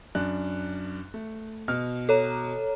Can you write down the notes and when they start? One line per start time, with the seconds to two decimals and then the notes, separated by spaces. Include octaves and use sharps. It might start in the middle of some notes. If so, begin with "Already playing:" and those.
0.15 F#2 D4 F#6
1.14 A3
1.68 B2 F6
2.09 A4 C#5 A#5